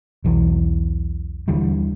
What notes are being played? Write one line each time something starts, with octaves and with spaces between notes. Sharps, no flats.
B1 E2 E3
D#2 D3 E3 G3